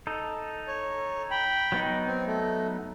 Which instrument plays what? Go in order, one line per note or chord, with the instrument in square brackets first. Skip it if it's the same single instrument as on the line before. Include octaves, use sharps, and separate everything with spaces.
[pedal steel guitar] D#4 A4
[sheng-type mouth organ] C#5
G5 B5
[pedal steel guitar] F#3 B3 D#4
[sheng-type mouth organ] C4
A3